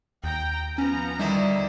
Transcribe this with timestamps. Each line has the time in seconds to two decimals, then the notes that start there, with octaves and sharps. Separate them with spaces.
0.24 D#2 G5 A#5
0.78 F3 B3 C#4 A#5
1.19 D3 D#3 G3 E4